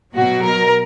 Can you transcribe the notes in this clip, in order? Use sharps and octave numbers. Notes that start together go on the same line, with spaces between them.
B2 F#3 F#4
A#4